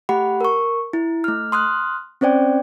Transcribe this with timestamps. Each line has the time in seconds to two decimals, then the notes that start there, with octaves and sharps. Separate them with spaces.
0.09 A3 G4 F#5 B5
0.41 A#4 C#6
0.93 E4
1.24 A3 F6
1.52 C6 D#6 F6 F#6
2.21 C4 C#4 C5 D5 G5